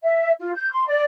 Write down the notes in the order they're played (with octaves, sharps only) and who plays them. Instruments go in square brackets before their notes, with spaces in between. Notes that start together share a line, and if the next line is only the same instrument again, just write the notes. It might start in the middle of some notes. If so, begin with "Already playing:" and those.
[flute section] E5
F4
G6
C6
D5